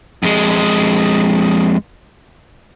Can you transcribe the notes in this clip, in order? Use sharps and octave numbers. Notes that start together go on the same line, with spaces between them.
F2 G#3